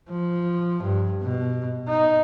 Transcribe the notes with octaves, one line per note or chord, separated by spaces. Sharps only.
F3
G2
B2
D#4